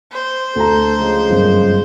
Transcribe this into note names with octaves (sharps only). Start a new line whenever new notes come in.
C5
D2 A4 A#5
C#3 F3 G#3
G1 F#2